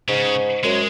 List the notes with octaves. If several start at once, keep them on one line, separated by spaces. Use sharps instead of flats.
G#2 C#3
F#2 G#3